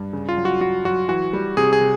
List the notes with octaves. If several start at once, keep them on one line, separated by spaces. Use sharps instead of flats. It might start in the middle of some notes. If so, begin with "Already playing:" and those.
Already playing: G2
C#3
F4
F#3
F#4
F#3 F#4
F#3 F#4
E3 F#4
G3
C3 G#4
G#4
C3